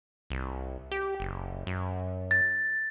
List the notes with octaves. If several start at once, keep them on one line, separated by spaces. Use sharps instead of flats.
C2
G4
F#1
F#2
A6